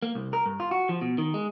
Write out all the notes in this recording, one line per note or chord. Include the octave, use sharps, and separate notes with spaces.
A#3
C2
A#4
G2
F4
F#4
F3
B2
D#3
G#3